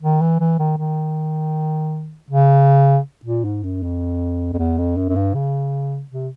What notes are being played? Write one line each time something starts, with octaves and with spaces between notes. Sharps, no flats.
D#3
E3
E3
D#3
D#3
C#3
A#2
G#2
F#2
F2
F2
E2
F2
F#2
F#2
G2
C#3
C3